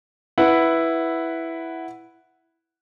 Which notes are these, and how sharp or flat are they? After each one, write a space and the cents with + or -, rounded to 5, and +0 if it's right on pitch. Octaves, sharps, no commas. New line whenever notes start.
E4 +0 B4 +0 F#5 +0